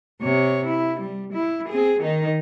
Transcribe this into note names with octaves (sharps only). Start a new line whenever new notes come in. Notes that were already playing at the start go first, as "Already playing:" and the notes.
C3 C#5
E4
G3
E4
C4 G#4
D#3 D#4